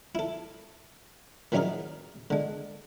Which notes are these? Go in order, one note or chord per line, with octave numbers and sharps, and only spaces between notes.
E4 A4
D#3 E3 F#3 C#4 G#4 A#4
D3 G#3